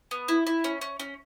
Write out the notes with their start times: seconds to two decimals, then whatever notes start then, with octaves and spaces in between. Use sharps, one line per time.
0.11 B3
0.28 E4
0.47 E4
0.64 C#4
0.81 C#4
1.00 C#4